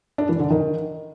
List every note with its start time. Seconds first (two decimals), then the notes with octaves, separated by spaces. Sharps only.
0.18 D4
0.29 E3
0.40 D3
0.50 D#3